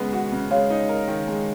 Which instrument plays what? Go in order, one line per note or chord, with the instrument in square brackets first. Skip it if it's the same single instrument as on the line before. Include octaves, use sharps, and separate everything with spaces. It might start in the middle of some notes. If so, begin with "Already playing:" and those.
Already playing: [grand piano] C#3 G#3 B3
F#4
C#3
[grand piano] G#3 [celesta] C#5 F5
[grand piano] D#4
A#4
D#3
G#3